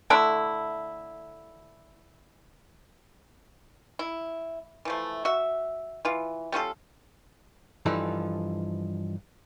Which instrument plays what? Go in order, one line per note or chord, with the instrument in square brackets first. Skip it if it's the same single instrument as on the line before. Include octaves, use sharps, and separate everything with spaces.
[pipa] D3 A3 E4
E4
E3 F3 A3
F#4 E5
E3 F4
G3 C#4 F4 A4
[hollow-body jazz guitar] G2 E3 F3 D#4 A4